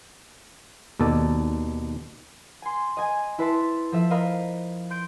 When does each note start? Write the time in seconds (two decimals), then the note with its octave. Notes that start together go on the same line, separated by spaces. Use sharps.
1.00 D#2 B2 A4 D5
2.62 G#5 C6
2.97 D#5 G#5
3.38 E4 B4 E5 A5 C6
3.92 F3 A4 E5
4.11 A#4 D#5 F5 B5
4.90 C6 G6 D7